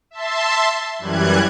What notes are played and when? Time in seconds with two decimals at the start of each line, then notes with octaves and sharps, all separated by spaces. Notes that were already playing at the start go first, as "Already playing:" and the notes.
0.11 E5 A5 C6
0.99 F#2 E3 G3 F#6 G#6